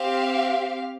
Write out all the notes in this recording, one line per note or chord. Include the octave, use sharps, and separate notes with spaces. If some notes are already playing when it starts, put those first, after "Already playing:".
Already playing: C4 G4 F5